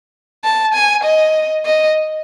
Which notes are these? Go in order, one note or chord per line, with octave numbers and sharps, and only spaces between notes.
A5
G#5
D#5
D#5